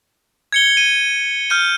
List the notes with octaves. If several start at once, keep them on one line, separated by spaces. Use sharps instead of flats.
G#6 C#7 G7
D#7
F6 G6 D#7